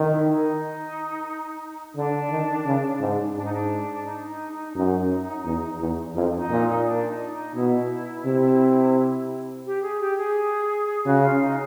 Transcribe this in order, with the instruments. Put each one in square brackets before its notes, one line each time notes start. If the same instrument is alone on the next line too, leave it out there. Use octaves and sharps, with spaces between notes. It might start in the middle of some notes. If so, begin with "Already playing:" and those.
Already playing: [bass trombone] D#3
[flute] E4
D#4
[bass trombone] D3 [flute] D4
[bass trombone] D#3
C#3
G#2
[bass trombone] G#2 [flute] D4
[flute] D#4
D4
D#4
D#4
D#4
D4
[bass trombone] F#2 [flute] D#4
[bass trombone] E2
E2
[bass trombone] F2 [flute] E4
[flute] D#4
D4
D#4
[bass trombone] A#2
[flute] D4
D#4
D#4
[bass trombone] B2 [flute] E4
[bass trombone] C3
[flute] G4
G#4
G4
G#4
[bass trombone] C#3 [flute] F#4
[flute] F4
D#4